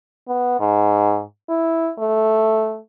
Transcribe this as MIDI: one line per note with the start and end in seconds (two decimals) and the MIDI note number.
0.28 0.59 59
0.60 1.21 44
1.49 1.91 64
1.99 2.78 57